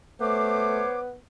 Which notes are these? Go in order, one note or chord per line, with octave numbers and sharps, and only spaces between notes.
A3 B3 C5 C#5 D6